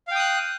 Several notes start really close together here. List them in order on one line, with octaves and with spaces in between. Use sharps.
F5 G5 D#6 F#6